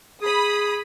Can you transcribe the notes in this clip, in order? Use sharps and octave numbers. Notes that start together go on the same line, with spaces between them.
G#4 B5 D#6